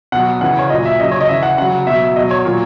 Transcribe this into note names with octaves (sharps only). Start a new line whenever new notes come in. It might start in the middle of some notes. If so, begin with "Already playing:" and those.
B2 F#3 F#5
C#3 E3 F#5
C#5
A#2 F#3 D#5
E5
C#3 F#3 D#5
C#5
D#5
C#3 E3 E5
F#5
C#3 F#3 F#5
B2 F#3 E5
B2 F#3 D#5
C#5
A#2 F#3